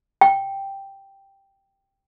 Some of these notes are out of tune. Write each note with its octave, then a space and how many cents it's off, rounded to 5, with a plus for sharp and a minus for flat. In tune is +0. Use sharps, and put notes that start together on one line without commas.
G5 +0